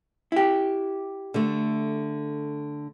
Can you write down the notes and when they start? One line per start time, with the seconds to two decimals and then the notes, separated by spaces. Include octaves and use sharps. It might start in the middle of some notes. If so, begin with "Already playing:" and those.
0.32 E4 G4
1.34 D3 A3